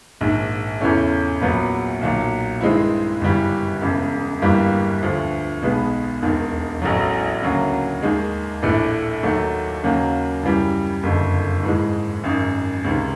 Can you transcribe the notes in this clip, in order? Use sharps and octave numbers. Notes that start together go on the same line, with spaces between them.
A#1 G#2 D#3
E2 C#3 E3 A3 C#4
A#1 A#2 F#3 B3
B1 A#2 F#3
G2 D#3 G#3 C4 E4
G1 F#2 C#3 E3 G3
E1 E2 C#3
G1 G2 E3 G3 A#3
D2 D3 F3
B1 B2 G#3 B3
E1 D#2 D#3
A1 A2 F#3
D2 C#3 F#3 A#3
D#2 D#3 G#3
A#1 A2 E3 A3 D4
D#2 D#3 F#3 A3
D#2 C#3 F#3 A#3
F#2 C#3 E3 G3
F#1 F2 D3
G#2 E3 G#3
G#1 F#2 D#3
C#2 C3 D#3